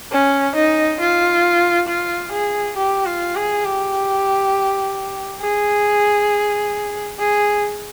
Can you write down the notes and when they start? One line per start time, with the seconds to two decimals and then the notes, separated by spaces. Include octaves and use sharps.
0.12 C#4
0.56 D#4
1.00 F4
1.88 F4
2.32 G#4
2.77 G4
3.06 F4
3.36 G#4
3.65 G4
5.41 G#4
7.19 G#4